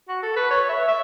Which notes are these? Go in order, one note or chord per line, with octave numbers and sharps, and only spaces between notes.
F#4
A4
B4
C#5
E5
E5